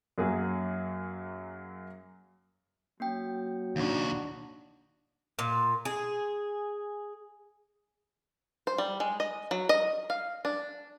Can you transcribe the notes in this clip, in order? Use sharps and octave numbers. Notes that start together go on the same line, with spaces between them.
F#2 F#3 A#3 G#4
F#3 A#3 C#4 G5
D#2 D4 D#4 F#4
A#2
G#4
C5
G3
G#3
D#5
F#3
D#5
F5
D4